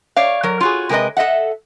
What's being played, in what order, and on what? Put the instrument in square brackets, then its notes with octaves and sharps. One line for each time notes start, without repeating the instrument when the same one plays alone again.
[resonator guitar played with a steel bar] C#5 D5 F5
F#3 A#4
F4 F#4 G#4
C3 G#3 A#4 B4 D#5
A4 D#5 E5 F#5